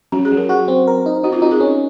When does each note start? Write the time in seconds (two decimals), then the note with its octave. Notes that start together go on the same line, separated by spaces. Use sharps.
0.12 F#3 C#4
0.25 G#4
0.32 F#3
0.37 A#4
0.49 F#4 G#4
0.68 C4
0.87 A#4
1.06 D#4
1.23 D#4 F#4
1.33 F4
1.42 D#4 F#4
1.51 G#4
1.60 C#4